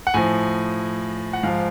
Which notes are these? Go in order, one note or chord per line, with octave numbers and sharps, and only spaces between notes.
F#5
A2 F3 G#5
F#5
G#2 F3 F5